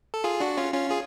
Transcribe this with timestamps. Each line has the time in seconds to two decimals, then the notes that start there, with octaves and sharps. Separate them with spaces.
0.14 A4
0.24 F4 G#4
0.40 D4 F#4
0.57 C#4 F4
0.74 C#4 F4
0.90 F4 G#4